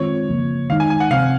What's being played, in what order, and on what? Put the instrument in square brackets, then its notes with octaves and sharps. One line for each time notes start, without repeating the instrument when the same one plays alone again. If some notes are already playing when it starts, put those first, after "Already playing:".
Already playing: [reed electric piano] D#3 G#3 C4 F4 [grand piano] C#5
[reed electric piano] C#3 F3 A#3
[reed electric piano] D#3 G#3 D#4 [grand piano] F5
[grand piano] G#5
G#5
F#5
[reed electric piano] C3 F3 C4 [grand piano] F5